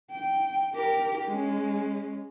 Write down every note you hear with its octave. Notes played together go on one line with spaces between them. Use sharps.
G5
G4 A#4
G#3 C#4